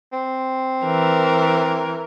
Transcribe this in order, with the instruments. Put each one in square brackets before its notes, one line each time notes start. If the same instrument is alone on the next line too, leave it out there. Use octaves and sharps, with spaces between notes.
[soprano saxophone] C4
[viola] E3 A#4